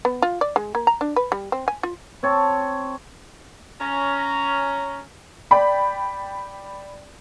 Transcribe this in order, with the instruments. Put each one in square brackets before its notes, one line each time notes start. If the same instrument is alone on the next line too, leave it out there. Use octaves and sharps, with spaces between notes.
[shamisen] B3
F4
D5
G#3
A#3
A#5
D4
B4
G3
C4
G#5
F4
[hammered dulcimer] C4 C#5 A5
[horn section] C#4 A#5
[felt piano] D5 G5 B5